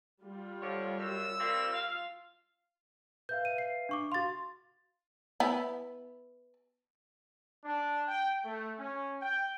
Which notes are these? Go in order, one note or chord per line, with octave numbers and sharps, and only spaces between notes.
G3 F4
D3 F3 C#5
F#2 E6
G3 A#3 C4 F4
F5
B4 E5 F5 G6
D#7
C7
D4 C#6 D6
F#4 F5 C6 A6
B3 E4
D4
G5
A3
C#4
G5